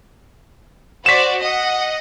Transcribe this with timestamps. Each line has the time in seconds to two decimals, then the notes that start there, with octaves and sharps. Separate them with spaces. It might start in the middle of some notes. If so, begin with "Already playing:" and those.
1.06 F#4 C5 D5 B6 E7
1.41 D#5 F#5